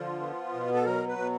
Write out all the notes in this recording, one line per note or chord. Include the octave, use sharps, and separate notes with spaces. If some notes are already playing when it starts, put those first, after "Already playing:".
Already playing: D3 F3 F4
B3
B2
A4
F#3 A#4
B4
B2